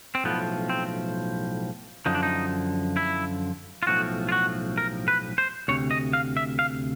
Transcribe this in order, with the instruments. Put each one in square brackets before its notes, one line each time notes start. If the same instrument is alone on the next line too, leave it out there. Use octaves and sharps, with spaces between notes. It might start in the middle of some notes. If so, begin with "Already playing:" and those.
[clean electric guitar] C4
B1 A2 F3 B3
C4
F#2 D3 F3 D#4
D4
D#4
E4
F4
B1 A2 F3 F#4
F4
F#4
A#4
B4
C5
D2 C3 C#5
D#5
F5
E5
F5